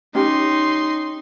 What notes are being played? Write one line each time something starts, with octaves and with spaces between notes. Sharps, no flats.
C#4 D#4 G4 C6